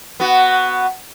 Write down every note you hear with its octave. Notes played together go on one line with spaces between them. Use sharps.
B3 F#4